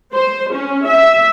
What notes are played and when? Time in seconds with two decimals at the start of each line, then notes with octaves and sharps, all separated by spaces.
0.13 C5
0.54 C#4
0.86 E5